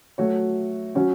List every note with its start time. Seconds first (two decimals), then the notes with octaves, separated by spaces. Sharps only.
0.18 F#3 A3 F#4 C#5
0.95 F#3 C#4 F#4